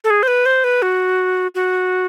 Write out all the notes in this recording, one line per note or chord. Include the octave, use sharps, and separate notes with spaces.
A4
G#4
C5
B4
C5
B4
F#4
F#4